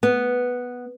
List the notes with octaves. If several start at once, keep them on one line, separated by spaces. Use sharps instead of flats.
B3